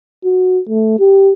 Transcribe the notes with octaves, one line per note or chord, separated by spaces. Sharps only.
F#4
A3
G4